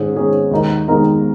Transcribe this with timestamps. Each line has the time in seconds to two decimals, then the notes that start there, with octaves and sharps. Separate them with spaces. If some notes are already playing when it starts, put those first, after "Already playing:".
Already playing: G#2 D#3 C#4 G#4
0.15 G#2 D#3 C#4 G#4
0.51 D#2 D#3 G#3 D#4 A#4
0.88 D#2 D#3 G#3 D#4 A#4